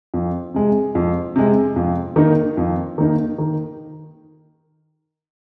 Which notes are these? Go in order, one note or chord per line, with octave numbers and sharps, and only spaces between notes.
F2
C3 G#3
F2
C3 G#3
F2
D#3 A#3 D#4
F2
D#3 A#3 D#4
D#3